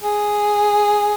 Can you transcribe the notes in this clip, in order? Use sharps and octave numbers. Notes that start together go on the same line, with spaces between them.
G#4